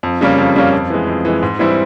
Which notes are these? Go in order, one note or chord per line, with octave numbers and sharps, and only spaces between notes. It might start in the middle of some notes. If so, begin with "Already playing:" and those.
F2
C#3 G3 A#3 C#4
F2
C#3 G3 A#3 C#4
F2
E3 G#3
F2
E3 G#3
G#2
E3 G3 C4 E4